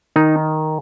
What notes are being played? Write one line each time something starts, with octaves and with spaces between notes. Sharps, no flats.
D#3 D#4